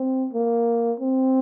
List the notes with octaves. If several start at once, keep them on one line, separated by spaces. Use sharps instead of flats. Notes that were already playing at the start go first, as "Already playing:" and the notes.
Already playing: C4
A#3
C4